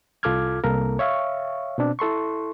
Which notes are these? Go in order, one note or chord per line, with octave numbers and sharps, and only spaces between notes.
C2 F4 A4 D6 F6 G#6
C2 A#3 A4 A#4
C#5 E5 F5 C#6
B2 C4 D4
E4 A4 C6 C#6